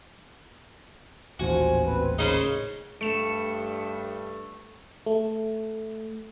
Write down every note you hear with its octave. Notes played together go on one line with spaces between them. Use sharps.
D#1 A1 D#2 F3 F#4 G#5
C4 B4
C#3 D#4 A#4 C5 B5
G2 A3 C#7 E7
A3